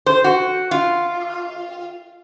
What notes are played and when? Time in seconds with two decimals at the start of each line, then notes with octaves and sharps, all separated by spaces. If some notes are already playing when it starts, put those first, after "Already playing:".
0.06 C5
0.24 F#4
0.71 F4